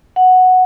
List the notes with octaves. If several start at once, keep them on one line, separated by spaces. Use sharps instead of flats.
F#5